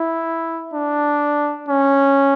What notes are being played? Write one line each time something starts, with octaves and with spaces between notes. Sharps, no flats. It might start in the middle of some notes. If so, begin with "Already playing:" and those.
Already playing: E4
D4
C#4